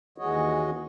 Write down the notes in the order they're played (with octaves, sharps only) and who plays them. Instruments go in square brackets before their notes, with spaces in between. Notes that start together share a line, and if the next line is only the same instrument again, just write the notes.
[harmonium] D#2 E3 G#3 F#4 C#5 D#5